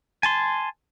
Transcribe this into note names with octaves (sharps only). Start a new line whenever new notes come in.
G#5 A5 C6